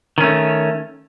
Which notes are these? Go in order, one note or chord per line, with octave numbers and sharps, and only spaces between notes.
D#3 A3 C#4